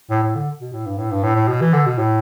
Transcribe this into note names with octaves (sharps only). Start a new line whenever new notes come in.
A2
A2
D3
B2
A2
G2
A2
G2
A2
A2
B2
E3
D3
B2
A2